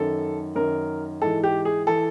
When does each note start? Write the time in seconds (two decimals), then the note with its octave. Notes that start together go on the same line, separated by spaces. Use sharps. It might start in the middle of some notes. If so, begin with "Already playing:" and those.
Already playing: F#2 D#3 A4
0.55 F#2 D#3 A#4
1.22 G#2 E3 A4
1.43 G4
1.65 G#4
1.87 E3 A4